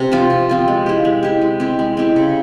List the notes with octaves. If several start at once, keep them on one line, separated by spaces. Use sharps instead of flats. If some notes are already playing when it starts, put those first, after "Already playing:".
Already playing: C3
F3 C4 F4
C3
F3 C4 F4
G#3
E4 G4
G#3
E4 G4
G#3
C4 E4 G4
G#3
C4 E4 G4
C#3